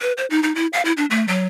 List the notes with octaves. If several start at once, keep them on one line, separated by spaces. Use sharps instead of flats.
B4
C5
D#4
D#4
E4
F5
E4
D4
A3
F#3